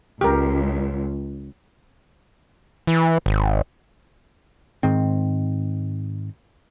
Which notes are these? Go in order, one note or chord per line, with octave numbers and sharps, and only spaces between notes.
C#2 G4 A#4
E3
G#1
G#2 D#3 C4